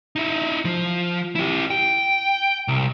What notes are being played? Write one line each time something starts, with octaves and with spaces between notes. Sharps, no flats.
D#4 E4
F3
E4 G4
G5
C2